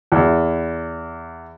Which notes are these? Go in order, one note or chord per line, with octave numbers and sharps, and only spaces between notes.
E2